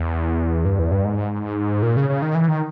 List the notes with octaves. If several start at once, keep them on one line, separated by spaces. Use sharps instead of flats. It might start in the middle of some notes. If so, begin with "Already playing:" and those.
Already playing: E2
G2
E2
G2
G#2
A#2
C#3
C#3
D#3
E3
D#3